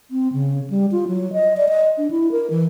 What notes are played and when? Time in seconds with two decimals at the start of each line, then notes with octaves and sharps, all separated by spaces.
0.11 C4
0.33 C#3
0.70 G3
0.92 F4
1.08 F#3
1.33 D#5
1.57 D5
1.69 D#5
1.98 D4
2.11 E4
2.32 A#4
2.50 E3